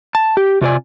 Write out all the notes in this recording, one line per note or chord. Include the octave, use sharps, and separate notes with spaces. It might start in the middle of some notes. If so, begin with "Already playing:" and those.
A5
G4
C3 F4 F#4 C#5 D5 G#5